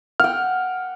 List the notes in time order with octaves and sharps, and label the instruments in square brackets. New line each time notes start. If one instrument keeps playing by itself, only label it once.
[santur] F#5 G5 [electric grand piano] F6